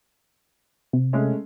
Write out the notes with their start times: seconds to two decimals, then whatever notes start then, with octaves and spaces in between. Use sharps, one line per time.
0.93 C3
1.13 G#3 A3 C#4